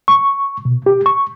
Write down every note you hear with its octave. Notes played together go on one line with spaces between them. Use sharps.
C#6
B2
G4
C#6